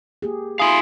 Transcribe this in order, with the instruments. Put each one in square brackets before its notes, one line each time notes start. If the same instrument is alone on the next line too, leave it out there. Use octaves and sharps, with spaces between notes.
[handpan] A#3 G4 G#4
[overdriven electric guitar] E4 F5 [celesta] G#5 D#6 [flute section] C6